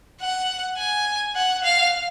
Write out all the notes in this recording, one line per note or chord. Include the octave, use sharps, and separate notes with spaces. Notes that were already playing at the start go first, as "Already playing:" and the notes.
F#5
G#5
F#5
F5